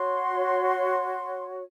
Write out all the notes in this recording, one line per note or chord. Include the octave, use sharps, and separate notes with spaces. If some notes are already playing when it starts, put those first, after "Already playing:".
Already playing: F#4 C#5 C6